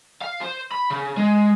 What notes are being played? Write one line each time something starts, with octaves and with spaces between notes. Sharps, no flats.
F5
C5
B5
C#3
G#3